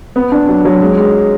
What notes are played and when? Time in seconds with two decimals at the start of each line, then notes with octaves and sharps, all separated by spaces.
0.16 B3
0.32 D4
0.49 F#3
0.65 F#3
0.82 G#3
0.97 G#3